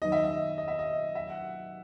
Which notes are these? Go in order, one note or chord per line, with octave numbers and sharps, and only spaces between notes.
F#2 D#3 F#3 B3 D#4 D#5
E5
D#5
D#5
E5
D#5
E5
F#5